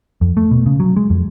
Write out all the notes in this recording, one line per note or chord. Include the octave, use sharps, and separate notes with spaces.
F2
A3
B2
C#3
F#3
G#3
F2